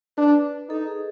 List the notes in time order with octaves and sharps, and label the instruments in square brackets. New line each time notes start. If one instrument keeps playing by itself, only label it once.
[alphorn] D4 [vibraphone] B4
[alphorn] D#4 [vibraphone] A4
[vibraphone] G#4